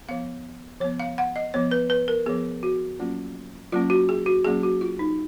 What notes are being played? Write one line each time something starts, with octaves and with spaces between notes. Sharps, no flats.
F3 B3 F5
F3 B3 C#5
F5
F#5
D#5
F3 B3 C#5
B4
B4
A#4
F3 B3 G#4
F#4
F#3 A#3 C#4 F4
F#3 A#3 C#4 F4
F#4
G#4
F#4
F#3 A#3 C#4 G#4
F#4
F4
D#4